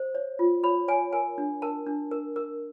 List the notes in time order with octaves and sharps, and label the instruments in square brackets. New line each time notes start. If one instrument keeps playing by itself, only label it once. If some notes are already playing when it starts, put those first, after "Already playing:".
Already playing: [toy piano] C5
C#5
F4
C#5 B5
C#5 G#5
A#4 G#5
D4
A#4 A5
D4
A#4
A#4